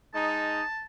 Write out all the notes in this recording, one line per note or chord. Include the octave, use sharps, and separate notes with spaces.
G#3 D#4 A5